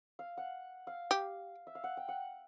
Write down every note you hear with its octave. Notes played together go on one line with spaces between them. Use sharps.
F5
F#5
F5
G4
E5
F5
F#5
G5
F#5